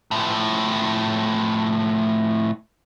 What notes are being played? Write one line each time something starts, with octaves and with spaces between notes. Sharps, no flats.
A2 F3